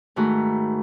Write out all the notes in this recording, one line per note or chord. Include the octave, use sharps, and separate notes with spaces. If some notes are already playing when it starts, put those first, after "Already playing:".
G#2 D#3 A3 F#4 B5